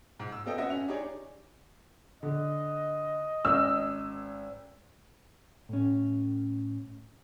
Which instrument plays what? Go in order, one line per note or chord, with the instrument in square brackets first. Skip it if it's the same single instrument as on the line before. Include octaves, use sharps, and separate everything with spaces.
[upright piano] G#2
E6
B3 C4 A4 D#5 F5 G5
F#2 D#5 E5 F#5 A#6
C#4 F7
D4 D#4 G4 G#4 C#5 D5
[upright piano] D3 [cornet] D#5
[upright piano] G#1 C#4 A#4 [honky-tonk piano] E6
[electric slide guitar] A2 C#4